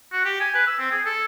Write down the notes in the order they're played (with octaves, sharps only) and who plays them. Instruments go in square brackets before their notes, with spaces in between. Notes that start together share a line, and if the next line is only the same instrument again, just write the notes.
[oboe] F#4
G4
G#5
B4
E6
C4
G#4
A4